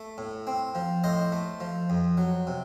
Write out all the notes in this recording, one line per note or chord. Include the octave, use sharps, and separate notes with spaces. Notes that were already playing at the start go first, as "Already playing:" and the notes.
Already playing: A3
A2
C4
F3
A2 C5 D#5
A3
F3
F2
F#3
C3